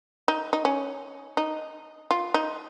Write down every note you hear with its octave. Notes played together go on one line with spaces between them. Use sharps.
D#4
D#4
C#4
D#4
F4
D#4